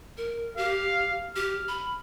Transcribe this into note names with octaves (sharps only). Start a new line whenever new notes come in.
A#4
G4 F5
G4 F6
B5